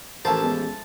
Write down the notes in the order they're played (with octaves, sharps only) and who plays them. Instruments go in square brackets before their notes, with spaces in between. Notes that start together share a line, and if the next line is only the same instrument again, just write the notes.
[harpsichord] A1 C5 [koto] F3 A3 E4 [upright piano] A#4 [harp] A5
[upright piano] G#3 B3 C#4